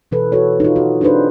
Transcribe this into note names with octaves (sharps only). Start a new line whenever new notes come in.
B2 E3 A4 B4
F#4 A4 B4 C#5
D#4 F4
F#4
D4 D#4 G#4 B4 C5